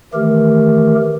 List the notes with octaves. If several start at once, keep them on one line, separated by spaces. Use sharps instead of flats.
D#3 E3 A3 G4 A#4